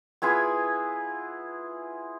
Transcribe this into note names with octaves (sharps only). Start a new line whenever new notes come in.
B3 E4 F4 G#4